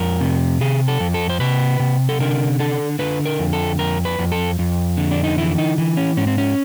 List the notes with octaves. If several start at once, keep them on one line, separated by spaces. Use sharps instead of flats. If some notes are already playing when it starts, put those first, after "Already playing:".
Already playing: F2 A#4
C3
C3 G#4
A4
F2
A4
C5
C3 B4
C3
A4
D3 A#4
D3 A4
D3 B4
A#4
F2
A4
F2 A#4
B4
F2
A4
F2
D3
D4
D#4
E3 E4
D#4
E3
C#4
G#2 C#4
C4
C#4